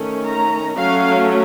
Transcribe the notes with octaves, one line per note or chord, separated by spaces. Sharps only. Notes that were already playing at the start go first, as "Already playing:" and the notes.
Already playing: D#3 A3 C#4
A#5
F#3 A3 C#4 F5